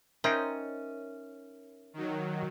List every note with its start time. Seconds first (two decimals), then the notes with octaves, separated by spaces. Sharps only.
0.24 C#4 D#4 A#4 C5 C#5 E5 G5
1.94 D#3 F#3